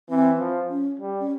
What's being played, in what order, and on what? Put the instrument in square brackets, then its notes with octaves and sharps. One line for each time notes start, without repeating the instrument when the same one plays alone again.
[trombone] E3 [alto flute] C4
[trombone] F3
[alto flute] C#4
[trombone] G3
[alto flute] C#4